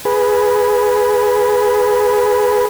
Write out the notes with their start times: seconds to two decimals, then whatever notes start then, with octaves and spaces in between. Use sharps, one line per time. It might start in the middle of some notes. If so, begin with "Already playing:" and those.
0.05 G#4 B4